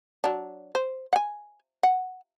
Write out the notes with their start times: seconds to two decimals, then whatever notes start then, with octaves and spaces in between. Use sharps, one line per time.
0.24 F#3 D4
0.75 C5
1.13 F#5 G#5
1.83 F#5